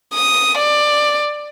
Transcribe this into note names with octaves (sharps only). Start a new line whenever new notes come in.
D#6
D5